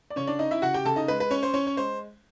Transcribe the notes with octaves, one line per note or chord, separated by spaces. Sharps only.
D5
C#3 C#4 C#5
D4 D5
C#4 D#4 D#5
E4 E5
C#3 F#4 F#5
G4 G5
C#3 A4 A5
D#4 D#5
G#3 B4
B4
C#4 C#5
C5
C#4 C#5
C#5
G#3 C5